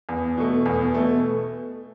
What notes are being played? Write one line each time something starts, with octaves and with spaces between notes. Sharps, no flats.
E2
B2 A3
E2
B2 A3